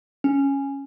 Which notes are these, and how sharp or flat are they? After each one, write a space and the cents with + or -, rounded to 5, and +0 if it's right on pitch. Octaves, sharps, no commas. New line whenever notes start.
C#4 -5